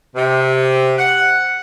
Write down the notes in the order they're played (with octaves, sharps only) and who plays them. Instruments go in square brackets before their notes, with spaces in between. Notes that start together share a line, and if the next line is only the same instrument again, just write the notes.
[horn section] C3
F#5